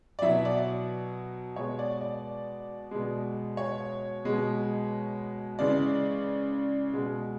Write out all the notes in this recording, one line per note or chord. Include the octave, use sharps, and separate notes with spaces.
D5
B2 F#3 E4 E5
D5
B2 G#3 C#5
D5
D5
B2 G#3
C#5
B2 G#3
C#3 E3 G#3 D5
B2 G#3